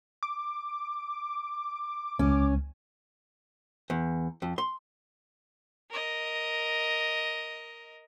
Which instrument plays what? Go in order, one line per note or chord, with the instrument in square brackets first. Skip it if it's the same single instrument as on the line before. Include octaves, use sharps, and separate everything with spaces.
[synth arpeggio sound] D6
[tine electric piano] C#2 [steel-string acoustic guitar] C#4
[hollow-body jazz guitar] E2
F2
C6
[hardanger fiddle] A#4 D#5